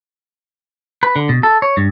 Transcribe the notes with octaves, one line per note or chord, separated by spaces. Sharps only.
B4
D3
B2
A4
C#5
G2